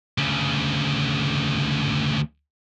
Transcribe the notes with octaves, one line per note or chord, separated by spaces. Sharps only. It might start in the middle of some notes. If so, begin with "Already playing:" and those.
D2 C#3